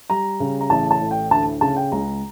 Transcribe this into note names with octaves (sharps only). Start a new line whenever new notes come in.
G3 A#5
C#3
A#5
A1 A5
A5
A2
G5
D2 A5
C#3 A5
G5
C#2 A#5